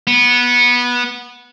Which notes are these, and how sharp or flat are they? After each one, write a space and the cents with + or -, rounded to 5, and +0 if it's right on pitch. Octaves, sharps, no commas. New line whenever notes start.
B3 -15